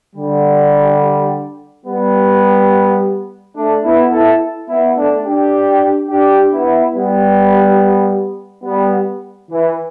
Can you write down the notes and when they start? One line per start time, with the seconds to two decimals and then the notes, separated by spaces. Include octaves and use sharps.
0.16 D3 G3
1.86 G3 B3
3.56 A3 D4
3.84 B3 E4
4.12 E4 A4
4.69 B3 E4
4.97 A3 D4
5.26 D4 G4
6.10 D4 G4
6.53 B3 E4
6.95 G3 B3
8.64 G3 B3
9.50 E3